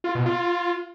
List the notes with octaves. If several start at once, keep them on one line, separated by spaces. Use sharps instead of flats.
F4
B2
F4